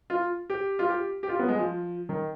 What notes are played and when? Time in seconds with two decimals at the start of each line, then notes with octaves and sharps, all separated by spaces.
0.10 F4
0.50 G4
0.79 F4
0.89 G4
1.23 G4
1.29 F4
1.39 B3
1.49 G#3
1.59 F3
2.09 D#3